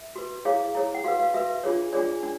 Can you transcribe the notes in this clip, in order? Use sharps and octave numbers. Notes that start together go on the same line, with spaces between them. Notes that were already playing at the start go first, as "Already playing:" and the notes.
Already playing: E5
F#4 B4
E4 G#4 C#5 F5
E4 G#4 C#5
F#5
F#4 B4 F5
F5
F#4 B4 E5
D4 F4 G#4 C#5
D4 F4 G#4 C#5 D5
D4